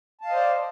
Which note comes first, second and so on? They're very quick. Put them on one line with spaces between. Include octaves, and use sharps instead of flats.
A5 F5 D#5 C5 D5